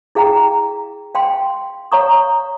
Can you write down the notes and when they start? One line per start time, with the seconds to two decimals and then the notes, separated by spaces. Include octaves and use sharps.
0.15 E4 G#4 F5 G5 A#5
1.15 F5 G5 C6
1.92 C#5 F5 A#5 C#6 D#6